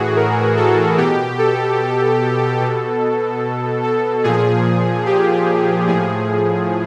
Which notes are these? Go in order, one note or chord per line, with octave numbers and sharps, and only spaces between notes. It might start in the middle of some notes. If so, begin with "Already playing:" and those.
Already playing: A2 E3 F#4 G#4
A#4
A4
B2 G4
A4
B2
A4
A#2 F3 G#4
G4
A2 F3 G#4